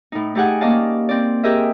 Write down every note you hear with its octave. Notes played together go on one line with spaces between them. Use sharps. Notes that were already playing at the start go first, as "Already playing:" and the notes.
A2 D#4
A3 D#4 G4 G#4 F#5 G#5
A#3 C#4 D5 D#5 F5 A5
C4 D5
G4 G#4 A#4 D#5 E5